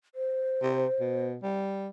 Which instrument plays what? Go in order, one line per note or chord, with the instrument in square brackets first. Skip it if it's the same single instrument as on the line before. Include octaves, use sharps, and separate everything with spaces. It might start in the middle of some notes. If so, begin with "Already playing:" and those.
[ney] C5
[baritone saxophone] C3
B2
G3